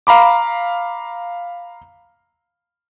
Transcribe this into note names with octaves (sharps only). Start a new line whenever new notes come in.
F5 A#5 B5 D6